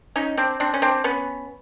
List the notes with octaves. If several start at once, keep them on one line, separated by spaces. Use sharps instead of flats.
C#4 D#4
C4 D4
C4 D4
C#4
C4 D4
B3 C#4